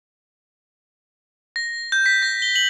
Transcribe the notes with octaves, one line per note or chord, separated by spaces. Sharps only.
A#6
G6
B6
A#6
G7
F#7